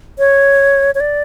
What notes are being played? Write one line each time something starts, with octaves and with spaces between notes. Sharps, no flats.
C#5
C#5
D5